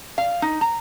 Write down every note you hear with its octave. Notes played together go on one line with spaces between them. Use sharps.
F5
D#4
A#5